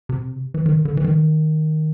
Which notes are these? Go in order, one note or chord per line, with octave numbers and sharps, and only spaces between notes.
C3
E3
D#3
D3
E3
D#3